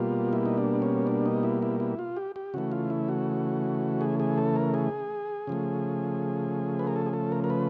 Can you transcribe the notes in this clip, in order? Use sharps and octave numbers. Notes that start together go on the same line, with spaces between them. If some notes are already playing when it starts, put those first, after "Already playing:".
Already playing: B2 G3 A#3 F4
E4
D#4
D4
C#4
D4
D#4
E4
E4
E4
F4
G4
G4
C#3 E3 A3 F#4
F4
E4
F#4
G#4
G#4
A4
A#4
G#4
C#3 F3 A3
B4
A#4
A4
G#4
A4
A#4
A#4
B4